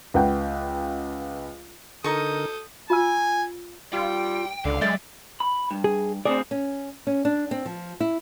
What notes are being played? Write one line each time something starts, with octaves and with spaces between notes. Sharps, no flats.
C#2 B4 F#5 G5
D3 D#4 A4 A#4 C#6 D#6 G6
F4 F5 G#5 E6
G3 F4 G5
C#2 D3 F5
F#3 G#3 D5 E5 G5
B5
G2
G#4
D2 C4 G#4 D5
C#4
C#4
D4
C4
F3
E4